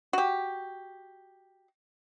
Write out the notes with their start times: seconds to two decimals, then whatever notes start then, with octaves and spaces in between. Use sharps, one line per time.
0.13 F#4 G4